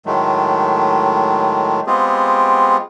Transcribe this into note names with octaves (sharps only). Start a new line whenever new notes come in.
A2 D#3 F#3 G#3 A3
G#3 B3 C4 F4 G4 G#4